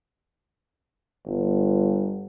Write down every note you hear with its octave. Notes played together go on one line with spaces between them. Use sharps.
G1